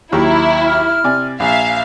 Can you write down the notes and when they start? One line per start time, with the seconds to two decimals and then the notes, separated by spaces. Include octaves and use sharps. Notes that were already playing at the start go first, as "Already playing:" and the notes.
0.12 D#2 F#3 E4 G4 A#5
0.66 F6
1.04 C3 D5 G#5
1.40 A#1 E5 F5 G#5